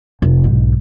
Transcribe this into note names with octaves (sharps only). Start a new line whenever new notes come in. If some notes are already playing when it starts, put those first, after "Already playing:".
F1
B1 G#2